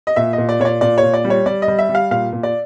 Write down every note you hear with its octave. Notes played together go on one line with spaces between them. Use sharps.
D#5
A#2 E5
A#2 D#5
D5
A#2 C#5
D5
A#2 D5
A#2 C#5
D5
G3
C#5
G3 D5
D#5
G3
E5
G3
F5
A#2 F5
A#2
D5